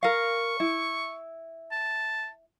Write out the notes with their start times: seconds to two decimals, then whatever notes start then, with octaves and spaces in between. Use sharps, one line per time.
0.03 A#4 F5 C#6
0.60 E4
1.72 A5